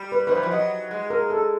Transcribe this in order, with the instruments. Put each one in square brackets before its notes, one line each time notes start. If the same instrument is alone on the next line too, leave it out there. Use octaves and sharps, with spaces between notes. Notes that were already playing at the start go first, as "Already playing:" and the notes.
Already playing: [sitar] G3
[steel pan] B4
[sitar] D#3 [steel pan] B4
[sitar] E3 [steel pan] C5
[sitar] F3
[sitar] F#3 [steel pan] D#5
[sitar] G#3
[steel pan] A#4
A4